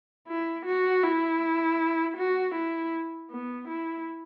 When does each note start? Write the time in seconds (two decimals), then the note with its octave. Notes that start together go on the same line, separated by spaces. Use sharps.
0.28 E4
0.66 F#4
1.03 E4
2.17 F#4
2.55 E4
3.30 B3
3.68 E4